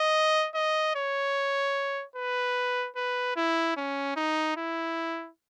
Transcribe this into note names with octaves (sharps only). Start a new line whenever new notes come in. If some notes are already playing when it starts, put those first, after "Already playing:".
Already playing: D#5
D#5
C#5
B4
B4
E4
C#4
D#4
E4